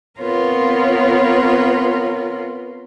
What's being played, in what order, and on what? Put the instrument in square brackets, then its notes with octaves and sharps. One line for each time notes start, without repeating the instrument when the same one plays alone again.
[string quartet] B3 C4 F4 A#4 B4 C#5